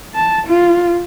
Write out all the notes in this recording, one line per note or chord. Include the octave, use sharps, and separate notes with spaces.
A5
F4